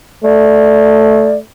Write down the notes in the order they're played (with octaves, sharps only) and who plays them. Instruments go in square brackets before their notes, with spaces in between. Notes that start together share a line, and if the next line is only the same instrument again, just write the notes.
[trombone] A3 [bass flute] D5